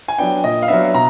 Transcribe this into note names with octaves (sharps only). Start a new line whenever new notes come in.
G#5
F#3 B3 D4 G5
A#2 D#5
F5
F#3 B3 D4 E5
B2 A#5